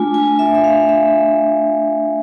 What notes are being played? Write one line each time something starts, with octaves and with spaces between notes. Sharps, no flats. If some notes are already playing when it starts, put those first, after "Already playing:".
Already playing: A3 D4 F4 G#5
G#5
E5
E5
F5
E5